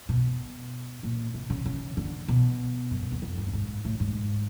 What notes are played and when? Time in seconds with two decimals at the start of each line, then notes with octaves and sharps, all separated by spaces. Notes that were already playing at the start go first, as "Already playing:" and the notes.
0.09 B2
1.03 A#2
1.34 C3
1.50 C#3
1.66 C#3
1.97 D3
2.28 B2
2.91 F#2
3.01 F#2
3.12 E2
3.22 F2
3.37 G2
3.48 A2
3.53 G#2
3.85 A2
4.00 G#2